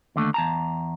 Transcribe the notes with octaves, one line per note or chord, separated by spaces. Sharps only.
D#2 D3 A3
E2 A5 A#5